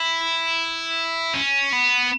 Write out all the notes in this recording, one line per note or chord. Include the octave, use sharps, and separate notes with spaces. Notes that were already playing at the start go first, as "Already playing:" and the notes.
Already playing: E4
C#4
B3